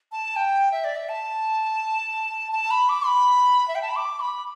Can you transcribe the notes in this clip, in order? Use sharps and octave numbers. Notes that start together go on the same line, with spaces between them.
A5
G5
E5
D5
E5
A5
A5
B5
D6
B5
E5
G5
A5
B5
D6
B5